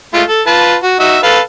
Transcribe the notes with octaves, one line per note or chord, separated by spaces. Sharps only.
G#3 A3 F4
A4
F4 B4 A5
F#4
D#4 F#4 E5
A4 B4 F5